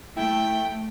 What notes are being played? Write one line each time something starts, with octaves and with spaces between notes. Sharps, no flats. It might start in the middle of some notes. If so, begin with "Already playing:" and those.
A3 E4 G5